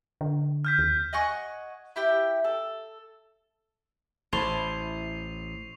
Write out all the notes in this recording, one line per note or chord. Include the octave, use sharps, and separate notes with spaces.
D3
F6 G6 B6
D#2
D#5 F#5 G#5 C#6
E4 G4 G5
A4
A1 E4 C5 A5 C#6 C7 F7